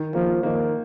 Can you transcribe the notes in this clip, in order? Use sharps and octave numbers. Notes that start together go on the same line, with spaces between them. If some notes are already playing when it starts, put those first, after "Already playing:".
Already playing: D#3
F3 A#3
D#3 A#3